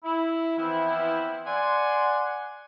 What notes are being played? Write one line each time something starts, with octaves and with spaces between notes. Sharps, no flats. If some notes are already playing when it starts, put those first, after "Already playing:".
E4
E3 F3 B3 C4 E4
D5 F#5 G#5 C6